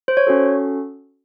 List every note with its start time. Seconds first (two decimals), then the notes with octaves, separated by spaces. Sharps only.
0.08 C5
0.17 C#5
0.27 C#4 F#4 A4